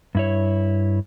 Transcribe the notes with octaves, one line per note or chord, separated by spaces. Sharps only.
G2 E4 C#5